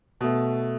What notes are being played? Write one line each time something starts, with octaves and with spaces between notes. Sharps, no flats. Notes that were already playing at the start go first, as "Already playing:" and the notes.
B2 A3